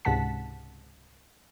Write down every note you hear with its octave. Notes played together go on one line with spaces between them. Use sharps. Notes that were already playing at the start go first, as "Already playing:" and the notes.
C#2 G#2 C3 F#5 A5 B6